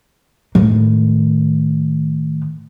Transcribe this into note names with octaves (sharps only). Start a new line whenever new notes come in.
A2 D#3